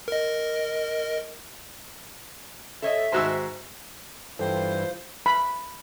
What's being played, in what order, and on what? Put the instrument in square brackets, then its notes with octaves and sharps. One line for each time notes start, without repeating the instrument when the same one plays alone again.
[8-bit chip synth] A#4 D#5
[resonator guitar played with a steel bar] A4 C#5 D#5 [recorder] E5
[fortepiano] G#2 F#4 E6 [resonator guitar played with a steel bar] D#3 G#3 C5
[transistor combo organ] G2 E3 [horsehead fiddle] F4 [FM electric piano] A4 G5 [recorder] C5
[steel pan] B5